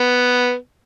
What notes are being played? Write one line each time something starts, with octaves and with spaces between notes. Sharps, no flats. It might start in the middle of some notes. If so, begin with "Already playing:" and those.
Already playing: B3